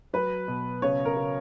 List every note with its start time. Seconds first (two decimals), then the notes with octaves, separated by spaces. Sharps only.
0.13 F#3 B4
0.48 B2
0.82 C#3 C#5
1.05 A#4
1.17 C#3